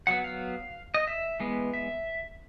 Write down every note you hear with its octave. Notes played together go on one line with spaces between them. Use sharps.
F#3 B3 F#5
F5
D#5
E5
E3 G#3 B3
E5